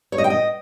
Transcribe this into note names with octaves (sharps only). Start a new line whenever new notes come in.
C#5
D#5
G5
D#5